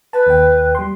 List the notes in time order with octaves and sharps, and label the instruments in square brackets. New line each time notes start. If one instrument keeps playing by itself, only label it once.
[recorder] B4 [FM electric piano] A5
[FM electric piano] D#2 G5
G3 C6